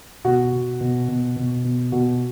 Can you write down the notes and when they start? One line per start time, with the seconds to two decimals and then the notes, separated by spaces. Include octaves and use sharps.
0.24 B2 F#4
0.52 B2
0.80 B2
1.08 B2
1.36 B2
1.64 B2
1.92 B2 F#4